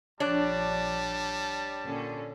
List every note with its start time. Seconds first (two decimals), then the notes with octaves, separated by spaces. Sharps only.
0.20 A#1 F3 G3 D4 C#5 D5 A5 F#6
1.83 A#2 D3 C#4